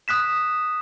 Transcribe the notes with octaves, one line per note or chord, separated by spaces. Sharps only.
D#6 F#6 B6 E7